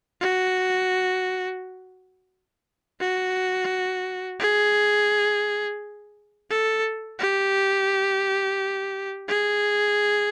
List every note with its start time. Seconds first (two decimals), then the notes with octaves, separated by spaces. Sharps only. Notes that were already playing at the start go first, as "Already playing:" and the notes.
0.21 F#4
3.00 F#4
4.40 G#4
6.50 A4
7.19 G4
9.28 G#4